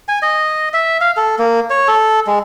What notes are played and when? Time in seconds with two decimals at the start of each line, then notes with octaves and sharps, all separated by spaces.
0.08 G#5
0.22 D#5
0.73 E5
1.01 F5
1.17 A4
1.39 A#3
1.70 C#5
1.88 A4
2.27 G#3